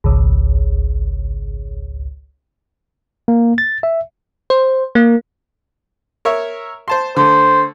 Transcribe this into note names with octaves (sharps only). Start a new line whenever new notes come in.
G#1 C#2
A#3
A6
E5
C5
A#3
A#4 C#5 E5
C5 A5 C6
D3 A3 C5